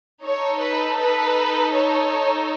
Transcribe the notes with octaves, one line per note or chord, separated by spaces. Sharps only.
D#4 A4 C#5
B4
B4
C#5